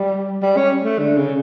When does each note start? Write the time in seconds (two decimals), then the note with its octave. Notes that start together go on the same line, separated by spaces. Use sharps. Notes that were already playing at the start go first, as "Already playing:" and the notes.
Already playing: G3
0.42 G3
0.57 C#4
0.84 A3
0.99 D3
1.17 C#3